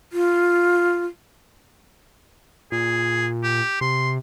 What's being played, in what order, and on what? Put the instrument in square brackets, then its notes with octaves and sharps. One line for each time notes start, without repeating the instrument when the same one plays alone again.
[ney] F4
[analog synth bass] A#2 [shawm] G#4
[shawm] G4
[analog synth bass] C3 [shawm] C6